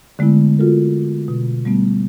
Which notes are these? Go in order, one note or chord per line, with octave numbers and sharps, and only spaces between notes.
D3 G#3 A3 B3 E4
F4 F#4 A4 A#4
B2
G3 A3 B3